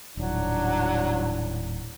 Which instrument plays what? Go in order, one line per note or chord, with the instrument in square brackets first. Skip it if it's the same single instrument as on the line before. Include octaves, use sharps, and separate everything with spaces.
[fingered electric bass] D#1 [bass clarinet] A2 [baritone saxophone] F#3 [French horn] D4